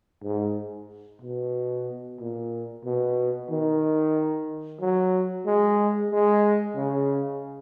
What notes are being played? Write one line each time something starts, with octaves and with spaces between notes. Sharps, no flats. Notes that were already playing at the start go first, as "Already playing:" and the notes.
G#2
B2
A#2
B2
D#3
F#3
G#3
G#3
C#3